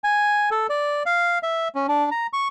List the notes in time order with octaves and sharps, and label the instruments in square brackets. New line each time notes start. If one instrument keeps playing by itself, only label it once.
[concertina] G#5
A4
D5
F5
E5
C#4
D4
A#5
C#6